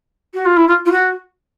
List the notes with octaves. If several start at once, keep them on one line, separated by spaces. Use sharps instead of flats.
F#4
F4
E4
F4
F4
F#4